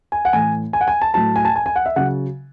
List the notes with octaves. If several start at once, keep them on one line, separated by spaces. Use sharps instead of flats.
G#5
F#5
A2 E3 G#5
G#5
F#5
G#5
A5
A2 F#3 A5
G#5
A5
G#5
G#5
F#5
E5
C#3 F#3 F#5